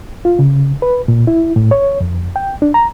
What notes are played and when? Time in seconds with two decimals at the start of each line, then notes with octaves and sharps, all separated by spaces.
0.25 F4
0.39 C#3
0.82 B4
1.08 A#2
1.27 E4
1.56 A2
1.71 C#5
2.01 F2
2.36 G5
2.62 D4
2.74 A#5